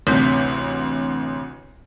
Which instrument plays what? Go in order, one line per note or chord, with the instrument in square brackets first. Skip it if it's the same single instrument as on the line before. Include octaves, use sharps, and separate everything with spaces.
[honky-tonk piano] A1 D2 C3 G6 B6